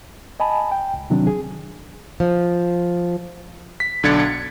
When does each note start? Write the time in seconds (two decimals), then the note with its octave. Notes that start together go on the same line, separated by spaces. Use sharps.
0.40 D#5 G#5 A5 B5
0.72 G5
0.94 C#2
1.10 C3 D#3 F#3 C4 D4
1.27 G#4
2.20 F3
3.80 B6
4.03 B1 D3 D4 G#6 A6 C#7
4.20 C#7